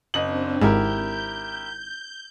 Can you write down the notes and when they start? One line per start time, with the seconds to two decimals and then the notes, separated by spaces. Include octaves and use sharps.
0.14 F#1 C4 D4 D#5 F#7
0.61 G#1 G#2 E4 G4 A#4 G6